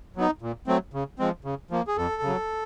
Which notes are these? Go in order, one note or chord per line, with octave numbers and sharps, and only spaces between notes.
F#3 B3 D#4
A#2
F#3 A3 C4
C#3
F3 G#3 C4
C#3
F3 A#3
G#4
F2 A4
C#3 F#3